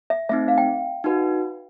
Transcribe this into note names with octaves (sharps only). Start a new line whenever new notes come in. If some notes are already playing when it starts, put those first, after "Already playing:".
E5
A3 C4 D#4 E5
F5
G5
D#4 F#4 B4